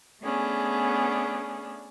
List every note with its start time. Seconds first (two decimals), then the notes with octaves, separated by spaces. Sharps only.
0.22 A3 B3 C#4 D4 G#4